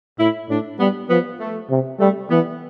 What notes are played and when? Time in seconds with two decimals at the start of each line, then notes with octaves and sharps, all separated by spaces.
0.19 A2 E4
0.49 A2 D4
0.79 G3 B3
1.09 F3 B3
1.40 A3
1.70 C3
2.00 G3 A3
2.30 E3 B3